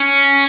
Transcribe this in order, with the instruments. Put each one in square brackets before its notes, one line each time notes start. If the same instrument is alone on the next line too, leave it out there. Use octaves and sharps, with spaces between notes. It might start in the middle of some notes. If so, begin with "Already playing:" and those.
Already playing: [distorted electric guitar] C#4